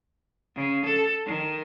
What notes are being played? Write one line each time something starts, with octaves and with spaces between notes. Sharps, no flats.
C#3
A4
D#3